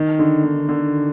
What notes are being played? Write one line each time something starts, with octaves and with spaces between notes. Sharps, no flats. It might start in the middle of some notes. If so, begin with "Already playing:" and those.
Already playing: D#3
D3
D#3
D3